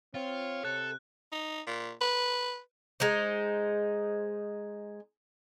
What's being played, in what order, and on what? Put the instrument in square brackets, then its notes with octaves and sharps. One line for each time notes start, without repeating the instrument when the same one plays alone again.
[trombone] C4 [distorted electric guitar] F4 [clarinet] C#5
[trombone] C3 [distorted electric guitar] A4 [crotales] F#6
[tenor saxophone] D#4
A#2
B4
[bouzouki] G#3 D#4 C5